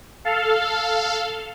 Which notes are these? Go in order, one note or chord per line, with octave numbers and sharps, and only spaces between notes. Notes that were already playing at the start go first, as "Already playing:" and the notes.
A4 F5